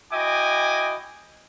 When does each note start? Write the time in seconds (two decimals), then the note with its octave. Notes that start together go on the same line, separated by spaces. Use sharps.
0.12 E4 F#4 D#5 G5 G#5 D6